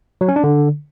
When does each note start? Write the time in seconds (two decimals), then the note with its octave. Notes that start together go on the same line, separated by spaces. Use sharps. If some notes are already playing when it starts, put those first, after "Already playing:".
0.21 F#3
0.28 C#4
0.36 D4
0.44 D3